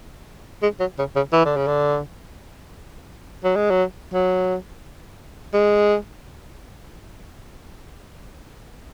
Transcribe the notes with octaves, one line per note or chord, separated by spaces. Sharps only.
G#3
F#3
C#3
C#3
E3
D3
C#3
D3
F#3
G#3
F#3
F#3
G#3